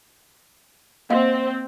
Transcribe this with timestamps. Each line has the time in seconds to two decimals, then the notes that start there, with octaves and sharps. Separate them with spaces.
1.10 A#3 C4 D#5 F5